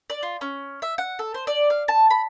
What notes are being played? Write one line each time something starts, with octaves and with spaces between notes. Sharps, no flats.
D5
F4
C#4
E5
F#5
A4
C5
D5
F5
A5
B5